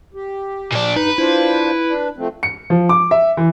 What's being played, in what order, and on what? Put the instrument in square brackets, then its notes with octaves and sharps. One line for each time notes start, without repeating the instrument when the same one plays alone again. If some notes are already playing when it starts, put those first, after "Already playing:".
[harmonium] G4
[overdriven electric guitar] A#2 D4
[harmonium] G2 [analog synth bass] D#4 [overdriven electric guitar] B4
[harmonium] D4 F4 C5 [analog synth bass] E4
[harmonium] D4
F3 A3 C4
[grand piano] C#7
F3
D6
E5
E3